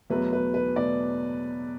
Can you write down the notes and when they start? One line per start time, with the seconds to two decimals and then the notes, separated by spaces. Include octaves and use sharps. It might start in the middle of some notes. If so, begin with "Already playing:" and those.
0.10 E2 B2 F#3 A3 B4
0.33 B4
0.54 B4
0.76 B2 A3 D5